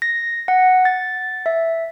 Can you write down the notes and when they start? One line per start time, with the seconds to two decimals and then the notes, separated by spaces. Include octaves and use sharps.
0.02 A#6
0.48 F#5
0.85 A6
1.46 E5